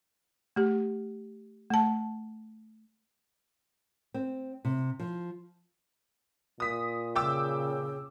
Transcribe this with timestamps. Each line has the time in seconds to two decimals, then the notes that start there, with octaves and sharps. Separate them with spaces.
0.56 A3 G4
1.70 A3 A5
4.14 C4
4.65 C3
5.00 F3
6.60 A#2 D#6 B6
7.16 C#3 G5 D6 E6